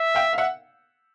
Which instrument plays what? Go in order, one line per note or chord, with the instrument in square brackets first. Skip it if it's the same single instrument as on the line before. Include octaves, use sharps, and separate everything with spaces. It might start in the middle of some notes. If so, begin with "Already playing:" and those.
Already playing: [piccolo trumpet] E5
[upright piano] F5 G5
F5
E5 F#5